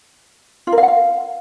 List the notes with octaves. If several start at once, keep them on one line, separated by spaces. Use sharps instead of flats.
F4
A#4
F5
F#5
F5